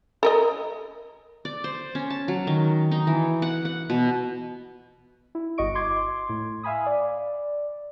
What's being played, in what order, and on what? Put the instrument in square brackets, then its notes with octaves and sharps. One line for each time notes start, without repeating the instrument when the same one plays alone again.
[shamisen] A4 A#4 D#5
[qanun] D5
C5
C#4
A5
F#3
D#3
D#4
E3
F#5
F#5
B2
[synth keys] E4
G1 F#4 D#5 C#6 D7
C6 D6 G#6
A2
E5 F5 G#5 B5 D#6
D5